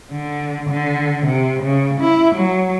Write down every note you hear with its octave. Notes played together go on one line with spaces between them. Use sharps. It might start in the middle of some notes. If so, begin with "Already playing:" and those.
D3
D3
C3
C#3
E4
F#3